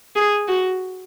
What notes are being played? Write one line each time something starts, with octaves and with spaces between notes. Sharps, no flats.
G#4
F#4